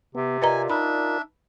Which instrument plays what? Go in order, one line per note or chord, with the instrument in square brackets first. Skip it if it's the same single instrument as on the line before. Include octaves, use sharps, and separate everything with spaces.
[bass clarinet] C3 [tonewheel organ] B3
[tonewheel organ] F4 A#4 D5 [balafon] B4 D#5 A#5 [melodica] G#5
[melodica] D4 E5 [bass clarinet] D#4 [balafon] B5